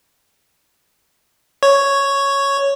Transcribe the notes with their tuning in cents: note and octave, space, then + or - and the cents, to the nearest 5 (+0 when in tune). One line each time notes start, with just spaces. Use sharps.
C#5 +0 C#6 +0